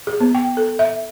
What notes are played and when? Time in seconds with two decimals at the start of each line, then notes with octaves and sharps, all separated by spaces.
0.07 G#4
0.20 B3
0.35 G5
0.57 A4
0.79 E5